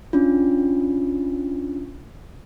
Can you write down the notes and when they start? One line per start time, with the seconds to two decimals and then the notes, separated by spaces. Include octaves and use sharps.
0.13 C#4 D4 F4